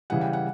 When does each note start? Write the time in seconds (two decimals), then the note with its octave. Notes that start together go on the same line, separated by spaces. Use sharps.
0.10 C#3 E3 G3 F#5
0.21 G5
0.33 F#5